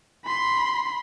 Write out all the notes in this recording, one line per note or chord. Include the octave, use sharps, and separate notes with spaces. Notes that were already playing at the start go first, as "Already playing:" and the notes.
B5 C6